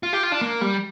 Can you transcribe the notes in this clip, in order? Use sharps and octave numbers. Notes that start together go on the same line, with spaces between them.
F4
G4
F4
D4
A#3
G3